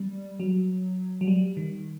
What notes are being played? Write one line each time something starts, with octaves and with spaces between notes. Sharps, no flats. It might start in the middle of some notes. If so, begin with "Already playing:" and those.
Already playing: G3
F#3
F#3
G3
D#3